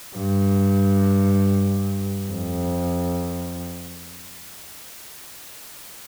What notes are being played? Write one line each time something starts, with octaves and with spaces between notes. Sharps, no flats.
G2
F2